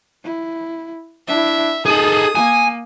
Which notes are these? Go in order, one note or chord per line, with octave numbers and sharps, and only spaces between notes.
E4
D4 E4 E5
D#4 G#4 A4 D#6
A#3 G#5